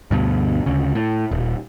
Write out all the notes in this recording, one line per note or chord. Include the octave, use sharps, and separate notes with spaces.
D2 G2 B2
D2 C#3
A2
D#1